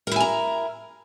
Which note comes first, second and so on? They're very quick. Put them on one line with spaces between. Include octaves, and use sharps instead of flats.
A#4 E4 G#5 A#5